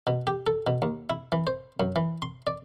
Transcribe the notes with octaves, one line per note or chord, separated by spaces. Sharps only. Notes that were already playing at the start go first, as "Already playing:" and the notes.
B2
G4
A4
B2
D#2
E4
E3
C5
F#2
E3
C6
D5